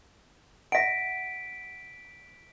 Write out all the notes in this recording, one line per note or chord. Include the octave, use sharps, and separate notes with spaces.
E5 F#5 B6 D7